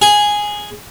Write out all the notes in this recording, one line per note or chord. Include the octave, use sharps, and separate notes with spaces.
G#4